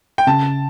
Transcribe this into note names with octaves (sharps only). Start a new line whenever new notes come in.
G5
C#3 A5